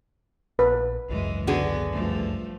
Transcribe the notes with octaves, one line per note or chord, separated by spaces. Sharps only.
A#1 B4
G#1 C#2 F#2 E3 G#3
D3 B3 F#4 G#4
G2 F3 A3